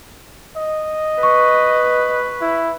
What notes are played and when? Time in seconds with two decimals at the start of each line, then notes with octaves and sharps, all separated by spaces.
0.56 D#5
1.23 B4 C#6
2.41 E4